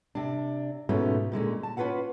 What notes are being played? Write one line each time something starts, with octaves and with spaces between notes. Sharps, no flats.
C3 D4
G#2 B2 A3 C#4 F4
A#2 D3 G#3 C#4
A5
C#4 F4 B4 F5 F#5